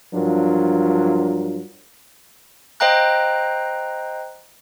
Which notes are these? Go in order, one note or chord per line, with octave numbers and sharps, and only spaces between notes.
G2 F3 F#3 D4 F4 A#4
C5 D#5 F5 G5 A#5 F#6